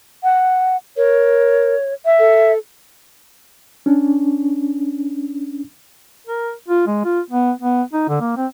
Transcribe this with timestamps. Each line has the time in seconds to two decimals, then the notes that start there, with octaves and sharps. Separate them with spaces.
0.24 F#5
0.97 A#4 C#5
2.05 E5
2.19 A4
3.86 C#4 D4
6.27 A#4
6.68 F4
6.87 G#3
7.05 F4
7.30 B3
7.60 B3
7.93 D#4
8.09 D3
8.21 A#3
8.37 C4